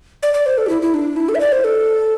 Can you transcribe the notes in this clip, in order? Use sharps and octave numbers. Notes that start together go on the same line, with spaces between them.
D5
D5
C5
A4
G4
E4
E4
D4
E4
A4
E5
D5
C5
A4